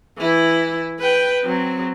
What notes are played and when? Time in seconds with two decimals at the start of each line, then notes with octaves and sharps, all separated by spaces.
0.18 E3 E4
0.99 B4 G5
1.44 F#3 C4